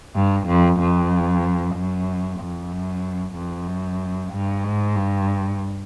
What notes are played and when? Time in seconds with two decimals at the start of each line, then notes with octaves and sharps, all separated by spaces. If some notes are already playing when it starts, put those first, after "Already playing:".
0.15 G2
0.48 F2
0.80 F2
1.75 F#2
2.40 F2
2.72 F#2
3.36 F2
3.68 F#2
4.32 G2
4.64 G#2
4.95 G2